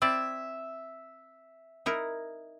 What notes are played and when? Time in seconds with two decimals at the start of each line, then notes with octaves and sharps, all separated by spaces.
0.02 C4 E4 D5 E5
1.86 D#4 E4 A#4